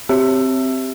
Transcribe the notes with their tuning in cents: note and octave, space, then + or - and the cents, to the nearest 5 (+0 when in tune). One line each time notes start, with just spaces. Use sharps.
C4 +0 G4 +0 E5 +0